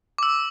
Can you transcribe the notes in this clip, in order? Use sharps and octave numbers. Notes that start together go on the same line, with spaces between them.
D6
E6